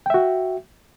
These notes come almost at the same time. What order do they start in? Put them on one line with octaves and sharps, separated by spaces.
G5 E5 F#4